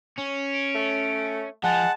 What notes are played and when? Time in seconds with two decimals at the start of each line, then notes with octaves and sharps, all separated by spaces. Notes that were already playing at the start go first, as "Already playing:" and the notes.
0.18 C#4
0.54 D7
0.75 A3
1.64 F3 G#3 F#5 A5